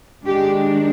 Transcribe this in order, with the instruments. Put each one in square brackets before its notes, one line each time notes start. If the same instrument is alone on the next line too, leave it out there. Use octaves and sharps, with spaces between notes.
[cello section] D#3 G#3 D4 G4